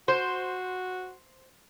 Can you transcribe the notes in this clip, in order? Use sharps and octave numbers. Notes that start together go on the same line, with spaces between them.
F#4 C5